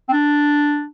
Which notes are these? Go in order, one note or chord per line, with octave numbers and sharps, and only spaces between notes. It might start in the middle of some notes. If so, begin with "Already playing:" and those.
C4
D4